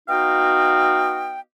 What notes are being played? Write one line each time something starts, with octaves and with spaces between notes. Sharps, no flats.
B3 D#4 F#4 D#5 F5 G5